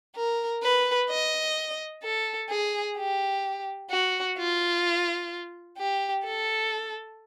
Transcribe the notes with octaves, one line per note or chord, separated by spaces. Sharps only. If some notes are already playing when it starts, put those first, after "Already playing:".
A#4
B4
D#5
A4
G#4
G4
F#4
F4
G4
A4